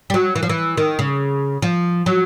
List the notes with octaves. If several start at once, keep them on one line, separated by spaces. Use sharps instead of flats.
G3
F#3
E3
F3
E3
D#3
C#3
F3
F#3